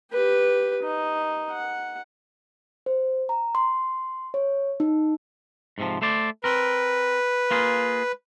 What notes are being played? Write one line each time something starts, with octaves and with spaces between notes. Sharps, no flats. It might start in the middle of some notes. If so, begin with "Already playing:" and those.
G4 B4
D#4
F#5
C5
A#5
C6
C#5
D#4
G#2 C3 F3
A3 C5 D5
C4 A#4 B4
A#3 F4 G#4